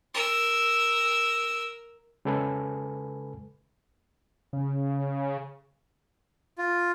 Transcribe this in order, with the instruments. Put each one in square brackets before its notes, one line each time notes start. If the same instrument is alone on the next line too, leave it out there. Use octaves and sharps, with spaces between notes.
[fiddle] A#4 E6
[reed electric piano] C#3 G#3 A4 B4 G#5 B5
[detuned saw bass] C#3
[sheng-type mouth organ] F4